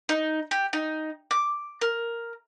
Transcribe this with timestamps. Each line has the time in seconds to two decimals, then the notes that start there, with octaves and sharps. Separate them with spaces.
0.09 D#4
0.51 G4
0.73 D#4
1.31 D6
1.81 A#4